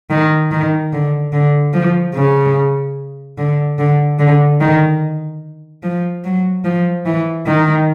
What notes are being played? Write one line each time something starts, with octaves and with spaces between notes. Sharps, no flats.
D#3
D#3
D3
D3
F3
C#3
D3
D3
D3
D#3
F3
F#3
F3
E3
D#3